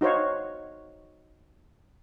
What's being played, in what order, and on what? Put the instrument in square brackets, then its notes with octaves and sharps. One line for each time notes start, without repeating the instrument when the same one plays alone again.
[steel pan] D#4 F#4 C5 C#5 F5